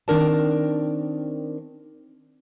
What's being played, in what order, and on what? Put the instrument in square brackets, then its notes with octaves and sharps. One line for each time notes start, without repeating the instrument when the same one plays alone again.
[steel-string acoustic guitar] D#3 C4 D4 A#4 D5 A5